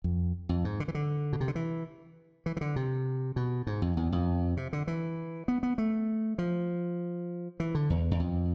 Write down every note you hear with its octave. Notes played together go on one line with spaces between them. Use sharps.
F2
F2
G#2
D3
E3
D3
B2
C3
D3
E3
E3
E3
D3
C3
B2
G#2
F2
E2
F2
C3
D3
E3
B3
B3
A3
F3
E3
D3
E2
E2
F2